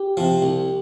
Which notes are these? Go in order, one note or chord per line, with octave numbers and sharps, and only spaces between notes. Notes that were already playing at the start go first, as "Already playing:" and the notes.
Already playing: G4
C3 F3
C2